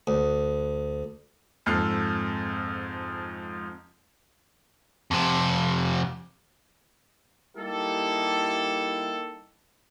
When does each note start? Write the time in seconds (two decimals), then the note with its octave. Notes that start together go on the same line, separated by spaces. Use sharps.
0.07 D2
1.66 F2 G#2 A4 F6 C7
5.11 F2 C3
7.57 G3 A#3 D#4 E4 G4 A4